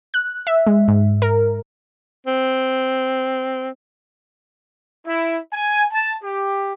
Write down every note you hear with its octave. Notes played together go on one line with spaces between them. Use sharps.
F#6
E5
G#3
G#2
A#4
C4
E4
G#5
A5
G4